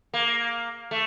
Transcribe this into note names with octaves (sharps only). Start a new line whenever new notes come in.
A#3
A3